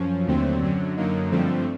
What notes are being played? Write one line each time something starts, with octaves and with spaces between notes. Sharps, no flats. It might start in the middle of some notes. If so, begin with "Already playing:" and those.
Already playing: F#2 F3 C#4
D#2 D3 F#3 A3 C4
F#2 D3 F#3
F#2 D3 F#3 A#3 D#4
G2 D3 F3 A3 C4